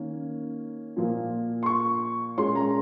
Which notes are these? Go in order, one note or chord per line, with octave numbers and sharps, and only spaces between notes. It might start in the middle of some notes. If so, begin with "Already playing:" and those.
Already playing: D#3 A#3 C#4
A#2 F3 A#3
C6
C#6
A#2 G#3 C#4 C6
A#5